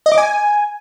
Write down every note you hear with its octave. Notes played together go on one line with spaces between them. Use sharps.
D#5
D6
G#5